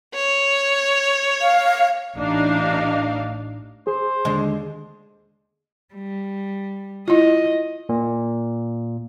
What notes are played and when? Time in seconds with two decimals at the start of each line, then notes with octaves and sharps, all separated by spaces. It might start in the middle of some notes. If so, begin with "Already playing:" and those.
0.15 C#5
1.41 F5
2.16 A1 D4 D#4 F5
3.87 G#4 C5
4.25 D#2 D3 G#3
5.94 G3
7.08 E4 F4 D#5
7.89 A#2